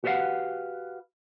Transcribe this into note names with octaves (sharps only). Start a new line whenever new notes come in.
F#4 G4 B4 D5 F5 F#5